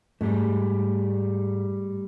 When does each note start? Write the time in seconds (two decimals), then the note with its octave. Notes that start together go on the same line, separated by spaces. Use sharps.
0.21 G#2 G3 A3